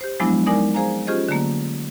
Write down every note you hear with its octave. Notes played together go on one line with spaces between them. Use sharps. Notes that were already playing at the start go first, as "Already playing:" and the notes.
G4 C5
F3 F#3 G#3 B3 D4 E4
G#3 D#4 A#4 D5 G#5 D6
G#4 C5 F5 G#5 A#5
C#4 F4 G4 G#4 C5 D#5
D3 F#3 A3 A#3